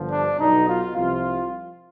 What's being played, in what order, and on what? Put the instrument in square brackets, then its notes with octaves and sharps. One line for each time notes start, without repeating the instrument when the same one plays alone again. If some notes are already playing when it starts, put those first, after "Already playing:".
Already playing: [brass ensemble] G1 G2 D3 F3
D4
B1 B2 D#4
F4
C2 C3 F3 F4